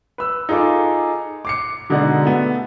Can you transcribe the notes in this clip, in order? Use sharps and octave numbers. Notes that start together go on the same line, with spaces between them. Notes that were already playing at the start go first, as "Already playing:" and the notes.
B4 E6
D#4 F4 G#4 A4 D6
D6 C7 C#7
B2 D3 G#3 D#4 D5 F#5
A3 B3